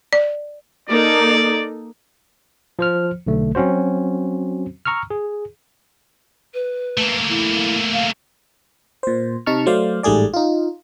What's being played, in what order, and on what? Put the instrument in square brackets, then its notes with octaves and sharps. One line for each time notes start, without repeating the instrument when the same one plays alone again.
[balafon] D5
[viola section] A#3 D#4 A4 [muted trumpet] D5
[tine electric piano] F3 C5 F6
B1 D3 A3
F#3 C4 C#4 F#4 C5
A#5 C#6 E6 F6
G#4
[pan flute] B4
[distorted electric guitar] A3 A#3
[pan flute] E4
F5
[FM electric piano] A#2 C5
C3 D#4 A5 C#6 F6
F#3 A3 C5 D5 F5
A1 G#2 G3 A3 G#4 D5
D#4 F4